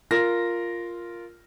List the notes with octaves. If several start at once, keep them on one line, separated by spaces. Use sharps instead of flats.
F4 A#4 A#6